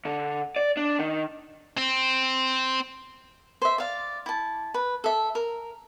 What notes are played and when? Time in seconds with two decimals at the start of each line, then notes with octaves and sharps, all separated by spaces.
0.05 D3
0.56 D5
0.77 D4
0.99 D#3
1.77 C4
3.62 C5 E5
3.78 D5 F5
4.26 E4 A5
4.74 B4
5.04 A4 E5
5.35 A#4